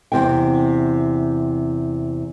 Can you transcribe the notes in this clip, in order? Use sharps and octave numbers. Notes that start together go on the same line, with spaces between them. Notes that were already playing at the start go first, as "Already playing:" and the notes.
E2 C3 G5